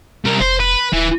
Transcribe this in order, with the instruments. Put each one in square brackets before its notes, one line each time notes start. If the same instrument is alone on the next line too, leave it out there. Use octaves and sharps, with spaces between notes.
[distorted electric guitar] C2 A#4
[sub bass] F1 [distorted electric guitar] C5
[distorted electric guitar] B4
[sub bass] D1 [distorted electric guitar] E3